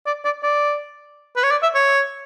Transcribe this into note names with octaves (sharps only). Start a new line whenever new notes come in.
D5
D5
D5
B4
C#5
D5
E5
C#5